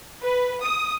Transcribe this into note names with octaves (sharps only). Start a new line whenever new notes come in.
B4
D#6